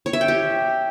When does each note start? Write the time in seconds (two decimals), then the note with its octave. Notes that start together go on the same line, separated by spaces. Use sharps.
0.06 C#5
0.13 E5
0.21 G5
0.28 G4